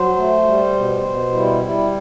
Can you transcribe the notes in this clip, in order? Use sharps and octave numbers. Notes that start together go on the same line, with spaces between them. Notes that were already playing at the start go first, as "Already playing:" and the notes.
Already playing: F#3 C5
A3
G3
B2
B2
G3 E4
G3 E4